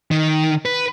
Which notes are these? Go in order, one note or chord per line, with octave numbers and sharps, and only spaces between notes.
D#3
B4